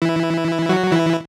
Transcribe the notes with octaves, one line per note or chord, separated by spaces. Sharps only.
E3 E4
F#3 F#4
E3 E4